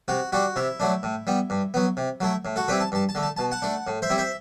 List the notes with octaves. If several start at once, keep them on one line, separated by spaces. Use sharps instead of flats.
C3 F#4
G3 D4 F#4
C3 E4
F#3 A3 D4
A2
G3 B3
G2
F#3 B3
C3
F#3 A3 E4
A2
F#4 A4
G3 C4 E4 G4 B4
A5
G2 A5
A5
D3 A3
A5
B2 A5
F#5 A5
A3 D4
A2
C5 E5
G3 C4 E4
C5 E5